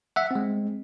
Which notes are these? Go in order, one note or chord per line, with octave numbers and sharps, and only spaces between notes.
E5 F#5
G#3 C4